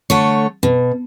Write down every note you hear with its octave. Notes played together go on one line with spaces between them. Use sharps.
D3 A3 C#5
B2